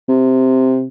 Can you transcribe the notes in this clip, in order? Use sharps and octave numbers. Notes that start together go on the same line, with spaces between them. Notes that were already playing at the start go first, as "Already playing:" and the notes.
C3